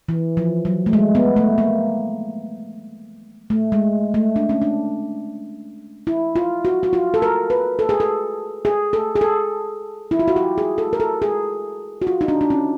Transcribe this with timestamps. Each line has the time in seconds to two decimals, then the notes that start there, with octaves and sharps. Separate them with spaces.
0.09 E3
0.37 F3
0.65 F#3
0.86 A3
0.93 G#3
1.15 B3
1.36 A3
1.58 A#3
3.50 A3
3.72 G#3
4.14 A3
4.36 D4
4.49 C#4
4.62 D4
6.07 E4
6.36 F4
6.65 F#4
6.83 F#4
6.93 F4
7.14 A4
7.22 A#4
7.50 B4
7.79 A4
7.89 G#4
8.00 A4
8.65 G#4
8.93 A4
9.16 G#4
9.21 A4
10.11 E4
10.19 F4
10.28 F#4
10.36 G4
10.58 G#4
10.78 A4
10.93 A#4
11.00 A4
11.22 G#4
12.02 F#4
12.07 F4
12.21 D#4
12.28 D4
12.41 D4
12.50 C#4